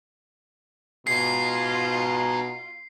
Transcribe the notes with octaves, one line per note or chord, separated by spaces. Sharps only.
B2 D#4 F4 G#4 C7